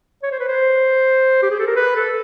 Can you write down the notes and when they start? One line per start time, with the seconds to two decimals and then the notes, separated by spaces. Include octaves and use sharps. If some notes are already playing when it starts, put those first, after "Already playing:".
0.23 C#5
0.32 C5
0.40 B4
0.48 C5
1.42 G4
1.50 G#4
1.59 A4
1.67 A#4
1.76 B4
1.96 A4